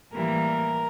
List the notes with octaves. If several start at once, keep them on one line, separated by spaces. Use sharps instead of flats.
A2 E3 G3 A#3 A#4